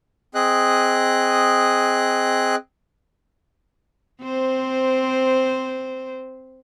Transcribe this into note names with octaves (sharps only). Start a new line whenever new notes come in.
C4 G#4 D#5 F#6
C4 C5